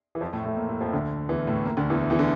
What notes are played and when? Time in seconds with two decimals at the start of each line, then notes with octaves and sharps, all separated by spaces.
0.15 E3
0.21 F2 F3
0.33 A2 A3
0.46 A2 A3
0.56 A#2 A#3
0.69 A2 A3
0.81 F2 F3
0.93 D2 D3
1.29 E2 E3
1.47 A2 A3
1.65 A#2 A#3
1.77 D2 D3
1.90 E2 E3
2.10 E2 E3
2.19 D3